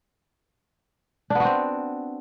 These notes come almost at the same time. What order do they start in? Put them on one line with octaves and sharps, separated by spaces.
D4 B3 F#4 C4